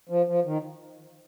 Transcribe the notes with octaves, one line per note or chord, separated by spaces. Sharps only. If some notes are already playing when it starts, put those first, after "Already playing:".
F3
F3
D#3